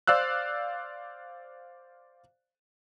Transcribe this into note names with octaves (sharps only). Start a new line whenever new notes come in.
C5 D5 F5 E6 F#6